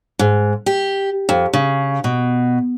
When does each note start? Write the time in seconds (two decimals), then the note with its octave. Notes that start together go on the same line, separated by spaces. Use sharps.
0.19 G#2
0.66 G4
1.29 F2
1.53 C#3
2.04 B2